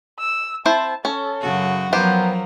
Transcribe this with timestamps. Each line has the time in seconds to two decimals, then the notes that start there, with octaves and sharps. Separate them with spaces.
0.19 E6
0.66 C4 E4 C5 A5
1.05 C#4 A4
1.42 F#2 C#3 F#4
1.93 F3 F#3 B3 G4 A#4 C5